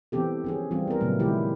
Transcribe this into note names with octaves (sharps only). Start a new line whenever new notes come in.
E3 B3 C4 G4 A4
F3 C#4 G#4
E3 G3 C4 F4
B3 A#4
A#2 C#3 F#3 A3 B3
D#3 G#3 E4 G4